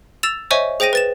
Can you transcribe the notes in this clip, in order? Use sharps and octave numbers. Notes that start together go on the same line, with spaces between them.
E6 A6 E7 F7
C5 C#5 D#5 E5 G#5 C#6
G#4 C5 G5 A#6 D#7
B4 A6 E7